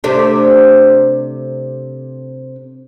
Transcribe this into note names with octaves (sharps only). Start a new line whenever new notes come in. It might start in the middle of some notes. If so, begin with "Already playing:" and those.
C3 A3 D4